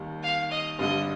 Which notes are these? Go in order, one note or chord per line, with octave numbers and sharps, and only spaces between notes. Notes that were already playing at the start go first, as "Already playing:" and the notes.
Already playing: D#2 D#3 G3
F5
D#5
G2 D3 G3 D#5